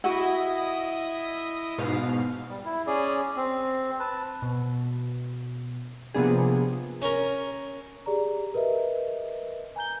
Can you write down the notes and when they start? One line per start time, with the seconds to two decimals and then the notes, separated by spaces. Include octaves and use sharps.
0.04 E4 F#4 D#5 F#5 A#6
1.78 G#2 B2 F5
2.49 G3
2.65 E4
2.87 C#4 G#4 D5
3.37 C4
4.00 B4 A5
4.42 B2
6.14 C3 F3 A#3 B3 D4 G#4
7.02 C#4 A#4
8.06 G4 G#4 D5 A#5
8.54 A#4 B4 D#5 E5
9.76 G#5 A#5 G6 G7